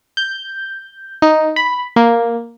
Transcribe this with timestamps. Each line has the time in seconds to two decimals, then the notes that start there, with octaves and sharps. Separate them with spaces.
0.17 G6
1.22 D#4
1.56 B5
1.96 A#3